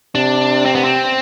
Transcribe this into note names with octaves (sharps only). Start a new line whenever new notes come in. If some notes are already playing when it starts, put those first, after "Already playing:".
C3 D4
C4
B3
C4